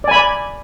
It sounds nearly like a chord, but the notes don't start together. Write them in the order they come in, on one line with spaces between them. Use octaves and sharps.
D5 G#5 B5